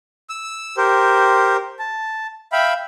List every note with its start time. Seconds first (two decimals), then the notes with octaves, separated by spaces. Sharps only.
0.30 E6
0.77 G4 A#4 C5
1.79 A5
2.52 E5 F5 G5 B5